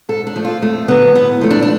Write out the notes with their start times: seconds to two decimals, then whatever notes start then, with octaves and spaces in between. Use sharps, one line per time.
0.09 G#2 A4
0.27 D4
0.36 F3 A3
0.45 F4
0.62 F2 A3
0.88 D3 F#3 B3
1.15 A2 B3
1.41 F3 A3
1.51 D4
1.62 D4